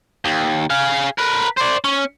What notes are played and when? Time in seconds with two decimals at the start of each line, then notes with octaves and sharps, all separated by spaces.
0.25 D#2
0.70 G#4 F5
1.19 A#4 B4
1.58 C5 D5
1.84 C#4